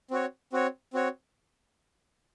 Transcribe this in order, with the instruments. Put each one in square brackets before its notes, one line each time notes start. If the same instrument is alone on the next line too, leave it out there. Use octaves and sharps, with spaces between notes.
[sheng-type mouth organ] C4 F#4 C#5
C4 F#4 C#5
C4 F#4 C#5